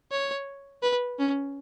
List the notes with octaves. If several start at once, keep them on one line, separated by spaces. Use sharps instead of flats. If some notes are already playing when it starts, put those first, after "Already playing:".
C#5
B4
C#4